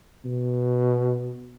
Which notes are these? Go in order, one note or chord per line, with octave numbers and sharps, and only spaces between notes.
B2